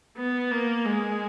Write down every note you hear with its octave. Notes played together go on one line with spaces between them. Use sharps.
B3
A#3
G#3